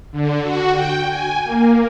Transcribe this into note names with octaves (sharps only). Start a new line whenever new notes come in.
D3
F#4
G5
G#5
A#3